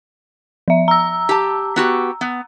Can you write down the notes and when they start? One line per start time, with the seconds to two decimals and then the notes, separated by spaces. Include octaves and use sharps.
0.68 F3 E5
0.88 A#5 E6
1.29 G4 A5
1.76 B3 F#4 G4
2.21 B3